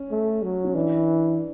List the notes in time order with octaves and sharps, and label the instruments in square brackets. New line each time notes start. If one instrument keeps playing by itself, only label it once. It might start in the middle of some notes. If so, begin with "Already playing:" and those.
Already playing: [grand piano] C#4
[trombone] A3
F#3
[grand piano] C#4
[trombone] E3 [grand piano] D4